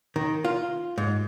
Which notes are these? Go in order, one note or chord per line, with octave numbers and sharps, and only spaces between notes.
D#3
F4
G#2